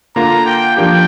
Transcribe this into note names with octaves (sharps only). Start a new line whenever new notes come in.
D3 A#3 F4 A#5
G5
F3 A#3 D4 G4 G5